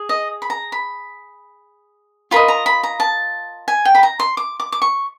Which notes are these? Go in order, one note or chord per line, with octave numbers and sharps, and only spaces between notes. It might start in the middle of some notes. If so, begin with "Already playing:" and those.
Already playing: G#4
D#5
B5
A#5
B5
F4 A#4 D#5 B5
A#5
B5
A#5
A5
G#5
G5
B5
A#5
C6
D6
D6
D6
C#6